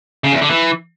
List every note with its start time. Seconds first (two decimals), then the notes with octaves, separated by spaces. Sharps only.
0.24 C#3
0.33 E2
0.41 D3
0.50 E3